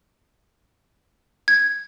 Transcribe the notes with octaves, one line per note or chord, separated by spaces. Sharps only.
G#6